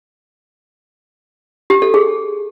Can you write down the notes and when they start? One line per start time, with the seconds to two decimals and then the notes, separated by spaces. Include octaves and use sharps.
1.70 G4
1.82 A4
1.94 G#4